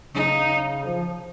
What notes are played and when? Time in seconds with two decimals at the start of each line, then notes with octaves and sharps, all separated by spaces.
0.14 C#3 D#4
0.85 F3